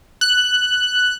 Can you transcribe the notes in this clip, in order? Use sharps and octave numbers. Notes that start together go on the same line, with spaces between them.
F#6